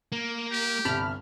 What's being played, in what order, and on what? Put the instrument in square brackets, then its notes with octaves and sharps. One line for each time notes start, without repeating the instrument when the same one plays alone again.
[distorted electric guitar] A#3
[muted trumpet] G4
[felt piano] G1 C2 [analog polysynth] A5 B5 F6